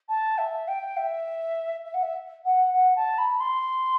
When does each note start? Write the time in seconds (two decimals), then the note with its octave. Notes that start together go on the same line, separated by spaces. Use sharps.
0.09 A5
0.38 E5
0.68 G5
0.97 E5
1.85 E5
1.94 F#5
2.03 E5
2.45 F#5
2.74 F#5
2.96 A5
3.18 B5
3.40 C6